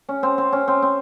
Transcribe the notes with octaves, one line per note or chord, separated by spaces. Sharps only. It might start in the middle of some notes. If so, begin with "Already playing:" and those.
C#4
C4
C4
C#4
C4
C4